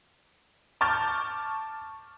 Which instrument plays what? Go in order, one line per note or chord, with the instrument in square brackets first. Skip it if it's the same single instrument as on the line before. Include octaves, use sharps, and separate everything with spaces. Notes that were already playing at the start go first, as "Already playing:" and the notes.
[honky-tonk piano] A5 C#6 D6 F6 G6 A6